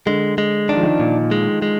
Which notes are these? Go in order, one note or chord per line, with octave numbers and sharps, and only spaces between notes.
D3 G#3
G#3
D#3 D4
F3
D#3
A#2
G#3
G#3